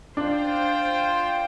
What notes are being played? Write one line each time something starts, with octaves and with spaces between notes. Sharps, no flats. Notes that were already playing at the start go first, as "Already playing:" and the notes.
D4 F4 C5 G5